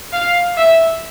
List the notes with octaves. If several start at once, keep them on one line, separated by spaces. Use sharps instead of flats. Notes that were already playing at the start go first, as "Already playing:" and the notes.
F5
E5